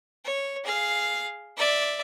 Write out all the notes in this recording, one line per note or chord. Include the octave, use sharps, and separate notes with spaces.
C#5
G#4 F5
D5 E5